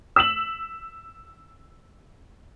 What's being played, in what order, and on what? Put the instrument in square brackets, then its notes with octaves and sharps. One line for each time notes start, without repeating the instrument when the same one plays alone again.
[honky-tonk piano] E6 B6 E7 F#7